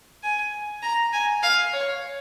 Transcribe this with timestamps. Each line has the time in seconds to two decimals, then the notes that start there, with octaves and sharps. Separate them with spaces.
0.23 G#5
0.82 A#5
1.13 G#5
1.43 F5
1.73 C#5